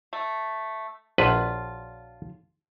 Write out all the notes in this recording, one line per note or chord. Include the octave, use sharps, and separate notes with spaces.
A3
A#1 F#3 D4 F4 B4